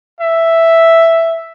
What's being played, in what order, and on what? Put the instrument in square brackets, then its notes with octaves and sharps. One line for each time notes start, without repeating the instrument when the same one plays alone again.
[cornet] E5